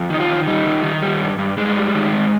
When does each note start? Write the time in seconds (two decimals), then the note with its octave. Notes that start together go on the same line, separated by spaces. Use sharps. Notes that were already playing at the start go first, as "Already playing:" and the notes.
Already playing: F2
0.10 D#3 D#4
0.20 F4
0.29 D#3
0.47 G3 D#4
0.66 D#3
0.83 D#3
1.03 G3
1.20 G2
1.39 G2
1.57 G2 G#3
1.76 G3
1.95 D#3
2.13 G#2